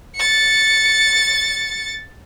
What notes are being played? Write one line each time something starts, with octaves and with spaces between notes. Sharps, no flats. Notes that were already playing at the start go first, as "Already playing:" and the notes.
A6 C#7